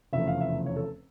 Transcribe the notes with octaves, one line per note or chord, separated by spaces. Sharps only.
F1 E2 C#3 F3 A3 E5
F5
E5
C#5
A4